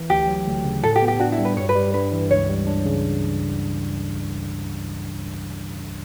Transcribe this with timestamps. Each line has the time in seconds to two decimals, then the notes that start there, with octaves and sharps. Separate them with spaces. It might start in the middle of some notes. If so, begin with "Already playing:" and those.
Already playing: E3
0.10 D2 G4
0.28 F#3
0.47 D2
0.65 C#3
0.83 A2 A4
0.96 G4
1.02 B3
1.08 G4
1.20 D4 F#4
1.32 E4
1.39 G3
1.45 B4
1.57 G2 C#5
1.69 B4
1.75 G3
1.94 G2 B4
2.12 E3
2.31 C#2 C#5
2.49 G3
2.67 D4
2.86 C#3